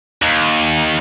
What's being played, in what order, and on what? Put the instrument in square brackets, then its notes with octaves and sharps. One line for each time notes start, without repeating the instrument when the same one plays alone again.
[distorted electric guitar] D#2